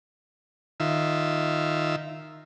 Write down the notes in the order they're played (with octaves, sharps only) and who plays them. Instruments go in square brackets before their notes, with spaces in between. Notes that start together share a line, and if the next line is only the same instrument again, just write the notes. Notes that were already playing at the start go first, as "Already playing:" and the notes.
[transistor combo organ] D#3 F4 E5